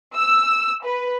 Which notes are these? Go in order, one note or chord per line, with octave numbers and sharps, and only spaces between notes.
E6
B4